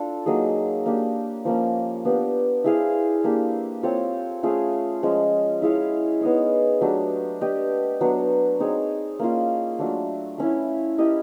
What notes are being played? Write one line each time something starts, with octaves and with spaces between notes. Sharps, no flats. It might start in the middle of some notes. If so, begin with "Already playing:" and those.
Already playing: D4 F4 A4
F#3 A#3 D#4 G#4
A#3 D4 G4
F3 A#3 C#4
B3 D4 G4
E4 G#4 C5 F5
A#3 D4 G4
C4 F4 A4 C#5
A3 C#4 F4 G#4
F3 G#3 C#4
E4 G#4 C#5 F5
B3 D#4 G#4 C#5
F#3 A3 D4 G4
D4 G4 B4 D#5
F#3 B3 D4
C4 D#4 G#4 C#5
A#3 C#4 F4
F#3 A3 D4
A3 C#4 E4
E4 G4 A#4 D#5